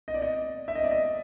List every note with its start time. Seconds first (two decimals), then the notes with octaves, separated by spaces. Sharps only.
0.08 D#5
0.14 D5
0.22 D#5
0.68 E5
0.75 D#5
0.83 D5
0.91 D#5